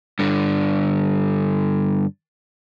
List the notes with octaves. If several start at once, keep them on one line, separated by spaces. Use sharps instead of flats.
G2 D3